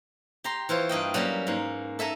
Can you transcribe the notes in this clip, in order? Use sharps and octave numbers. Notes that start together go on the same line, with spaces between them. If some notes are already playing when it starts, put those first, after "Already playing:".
G4 A#5 C6
E3 F4 C5 C#5
G2 A#3 D#5 G5
F#3 G3 A#3 C#4 A#4
G#2 A#3
A4 E5 G#5 A#5